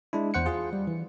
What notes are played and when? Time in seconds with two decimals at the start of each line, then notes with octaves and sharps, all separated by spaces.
0.13 G#3 D4 E4
0.34 E2 C5 F#5 C#7
0.46 F4 G#4
0.73 G3
0.87 E3